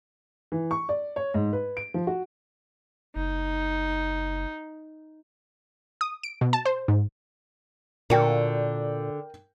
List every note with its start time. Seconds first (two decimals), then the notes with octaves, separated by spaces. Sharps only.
0.52 E3
0.71 C#6
0.89 D5
1.16 C#5
1.34 G#2
1.53 B4
1.77 D7
1.94 F3
2.07 F#4
3.15 F#1 D#4
6.01 D#6
6.23 D7
6.41 B2
6.53 A5
6.66 C5
6.88 G#2
8.10 A#2 D3 F#4 A#4 G5